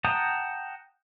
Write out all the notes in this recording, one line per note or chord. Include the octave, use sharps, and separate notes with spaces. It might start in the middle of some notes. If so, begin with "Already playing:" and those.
F#5 G5 A5 A#5 D#6